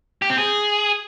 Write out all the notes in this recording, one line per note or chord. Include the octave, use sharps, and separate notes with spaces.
G4
C4
G#4